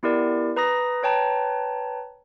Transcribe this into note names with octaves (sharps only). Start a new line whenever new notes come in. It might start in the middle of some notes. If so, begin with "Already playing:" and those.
B3 E4 G4 A#4 D5
B4 A#5 D#6 A#6
B4 C#5 G5 A5 A#5